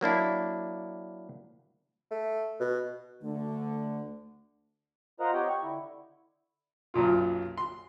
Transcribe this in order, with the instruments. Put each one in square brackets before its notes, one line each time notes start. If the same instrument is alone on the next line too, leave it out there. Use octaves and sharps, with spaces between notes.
[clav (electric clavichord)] F#3 A#3 D4 E4
[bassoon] A3
B2
[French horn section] D2 D3 [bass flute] A3
[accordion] F4 A#4 C5 D#5 F#5 A#5
C4 G4 C#5 D#5 F#5 G5
C#6
D3 E4
[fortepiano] B1 F#2 A#2 F4
C6